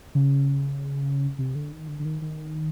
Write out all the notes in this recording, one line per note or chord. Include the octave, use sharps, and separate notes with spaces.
C#3
C3
D3
D#3
D3
D3
D#3
D#3